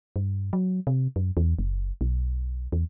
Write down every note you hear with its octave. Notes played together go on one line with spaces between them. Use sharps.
G2
F#3
C3
F#2
E2
F#1
B1
E2